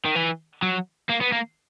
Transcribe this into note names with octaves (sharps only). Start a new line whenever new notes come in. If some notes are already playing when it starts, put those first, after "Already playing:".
D#3
E3
F#3
A#3
B3
A#3